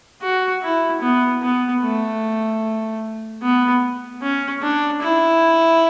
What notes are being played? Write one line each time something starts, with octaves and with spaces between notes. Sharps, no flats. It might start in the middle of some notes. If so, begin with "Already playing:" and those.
F#4
E4
B3
B3
A3
B3
C#4
D4
E4